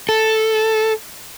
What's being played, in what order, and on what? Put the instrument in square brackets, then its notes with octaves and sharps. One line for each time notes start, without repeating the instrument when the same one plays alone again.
[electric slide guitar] A4